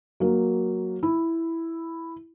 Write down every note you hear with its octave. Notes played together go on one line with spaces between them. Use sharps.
F#3 A#3
E4